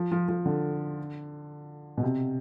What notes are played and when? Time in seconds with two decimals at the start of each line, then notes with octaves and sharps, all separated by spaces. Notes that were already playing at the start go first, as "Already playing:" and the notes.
Already playing: F3
0.12 F3
0.28 F3
0.46 D3
1.97 B2
2.03 C3